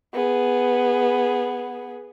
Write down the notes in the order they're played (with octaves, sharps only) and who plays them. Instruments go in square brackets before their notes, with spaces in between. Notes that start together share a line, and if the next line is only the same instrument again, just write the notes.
[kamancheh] B3 G#4